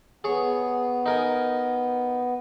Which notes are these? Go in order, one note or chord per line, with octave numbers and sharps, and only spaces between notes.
B3 G#4 C#5
D#4 A#4 G#5